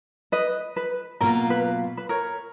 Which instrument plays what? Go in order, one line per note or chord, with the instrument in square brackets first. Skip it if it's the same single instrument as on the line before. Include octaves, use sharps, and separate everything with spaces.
[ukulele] B4 D#5
B4
[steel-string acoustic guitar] B2 F#3 A#3 F4 [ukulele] A#4
[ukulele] B4
B4
A#4 C#5